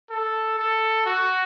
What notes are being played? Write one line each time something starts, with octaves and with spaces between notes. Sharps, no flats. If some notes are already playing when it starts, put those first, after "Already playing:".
A4
A4
F#4